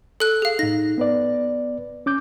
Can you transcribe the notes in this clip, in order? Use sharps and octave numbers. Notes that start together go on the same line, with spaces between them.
A4 F#6
G#4 F5
A2 D#4 A#6
B3 B4 D5
C#4 D6 G6